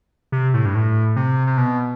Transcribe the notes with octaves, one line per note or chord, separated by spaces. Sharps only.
C3
A2
G2
A2
C3
C3
B2